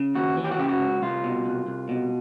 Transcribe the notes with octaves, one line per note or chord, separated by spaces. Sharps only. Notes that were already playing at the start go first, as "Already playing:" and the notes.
Already playing: C#3
D#2 F#4
E3
G4
F#4
C#3 G4
F#4
C#2
C2 F4
B2
C2
C2
B2